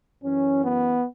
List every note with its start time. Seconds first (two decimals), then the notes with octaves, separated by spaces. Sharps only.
0.23 F#2 E3 C#4
0.62 B3